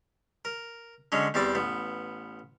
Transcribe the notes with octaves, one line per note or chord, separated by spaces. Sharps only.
A#4
D3 F#3 G#3 C#4
E2 G3 C4 D5 D6
A1 B3